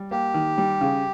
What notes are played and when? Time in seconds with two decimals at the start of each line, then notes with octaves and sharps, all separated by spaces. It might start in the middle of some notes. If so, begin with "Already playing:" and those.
Already playing: G3
0.11 A#3 G4
0.34 D#3
0.58 G3
0.81 C#3